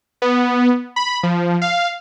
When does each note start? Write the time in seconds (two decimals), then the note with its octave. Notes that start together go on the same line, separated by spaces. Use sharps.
0.22 B3
0.96 B5
1.23 F3
1.62 F5